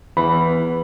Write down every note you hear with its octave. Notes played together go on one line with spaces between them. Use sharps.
E2 E3 B5